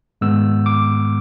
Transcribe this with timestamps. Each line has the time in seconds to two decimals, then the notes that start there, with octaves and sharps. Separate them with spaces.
0.21 G#2 D#3 G#3 B3 E6
0.66 D6